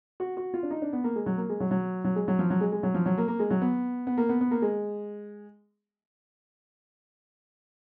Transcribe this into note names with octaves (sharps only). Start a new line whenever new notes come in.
F#4
F#4
F4
D4
D#4
D4
B3
A#3
G#3
F#3
A#3
G#3
F#3
F#3
F#3
G#3
F#3
F3
F#3
G#3
G#3
F#3
F3
F#3
A#3
A#3
G#3
F#3
B3
B3
A#3
B3
B3
A#3
G#3